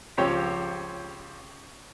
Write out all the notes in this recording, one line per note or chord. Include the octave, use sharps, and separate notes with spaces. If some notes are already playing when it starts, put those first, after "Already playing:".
C#2 F3 C4 G4 C#5 G5